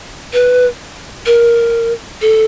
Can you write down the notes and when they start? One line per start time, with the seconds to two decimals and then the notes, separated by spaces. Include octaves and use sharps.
0.33 B4
1.26 A#4
2.21 A4